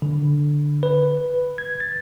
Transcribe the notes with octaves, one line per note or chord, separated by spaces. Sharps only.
D3
B4
G#6
A6